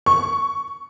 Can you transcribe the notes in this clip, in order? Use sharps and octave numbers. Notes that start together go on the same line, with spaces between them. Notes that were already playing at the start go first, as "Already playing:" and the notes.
C#6